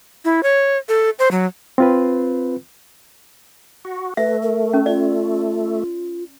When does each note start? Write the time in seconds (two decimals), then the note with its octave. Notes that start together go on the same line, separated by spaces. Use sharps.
0.25 E4
0.43 C#5
0.88 A4
1.19 C5
1.31 F#3
1.78 C4 F4 B4
3.85 F#4
4.17 A3 B4 E5
4.42 A#4
4.74 C#4
4.86 F4 D5